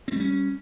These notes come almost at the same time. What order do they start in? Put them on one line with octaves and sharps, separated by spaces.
C4 A3 G3 C#4